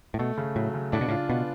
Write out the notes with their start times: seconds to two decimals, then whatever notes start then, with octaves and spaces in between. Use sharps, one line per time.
0.14 A2
0.19 B2 A3
0.38 C#3
0.55 A2 F#3
0.74 C#3
0.92 A2 D4
1.01 B2
1.08 A2 F4
1.29 B2 B3